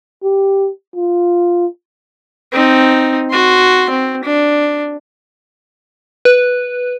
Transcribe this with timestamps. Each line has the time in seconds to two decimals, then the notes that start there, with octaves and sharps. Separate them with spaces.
0.23 G4
0.95 F4
2.53 C4 D#4
3.31 F#4 C6
3.90 C4
4.23 D4
6.25 B4